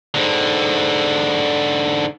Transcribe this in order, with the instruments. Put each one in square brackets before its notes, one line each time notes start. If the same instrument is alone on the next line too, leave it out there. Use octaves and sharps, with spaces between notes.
[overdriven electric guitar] G#2 D3